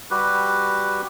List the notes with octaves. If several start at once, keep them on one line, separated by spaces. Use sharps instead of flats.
G3 F#4 G4 B4